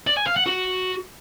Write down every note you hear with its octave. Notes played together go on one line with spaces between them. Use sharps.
D5
G#5
F5
F#5
F#4